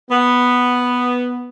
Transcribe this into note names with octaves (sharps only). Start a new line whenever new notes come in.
B3